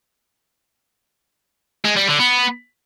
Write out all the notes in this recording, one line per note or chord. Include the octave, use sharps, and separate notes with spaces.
G#3
G3
D3
B3